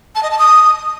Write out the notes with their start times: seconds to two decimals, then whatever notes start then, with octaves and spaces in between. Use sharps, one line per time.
0.15 A5
0.23 D#5
0.31 A5
0.39 D#6